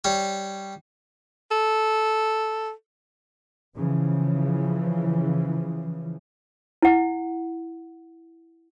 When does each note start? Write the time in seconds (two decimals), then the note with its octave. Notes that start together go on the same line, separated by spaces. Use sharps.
0.04 G3 C#5
1.51 A4
3.75 C#3 E3 F3
6.82 E4 F#5